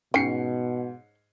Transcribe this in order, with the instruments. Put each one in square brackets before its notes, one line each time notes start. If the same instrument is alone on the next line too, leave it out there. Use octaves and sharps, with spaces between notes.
[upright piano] G#2 C7 C#7 [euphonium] B2 [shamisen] C#4 G5